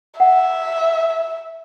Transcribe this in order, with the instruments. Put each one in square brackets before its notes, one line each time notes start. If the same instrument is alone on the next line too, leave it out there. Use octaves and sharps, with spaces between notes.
[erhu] E5 [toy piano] F#5